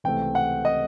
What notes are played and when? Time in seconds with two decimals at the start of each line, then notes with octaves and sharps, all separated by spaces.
0.04 C#2 C3 E3 A3 C4 G5
0.35 F#5
0.65 D#5